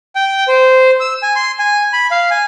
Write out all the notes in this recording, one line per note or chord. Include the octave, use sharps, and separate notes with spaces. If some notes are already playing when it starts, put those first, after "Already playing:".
G5
C5
E6
G#5
C6
G#5
B5
F5
G#5